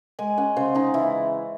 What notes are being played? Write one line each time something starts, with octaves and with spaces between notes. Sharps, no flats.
G#3 G#5
C#4 F#5
C#3 C5
C#3 D#4
E3 E4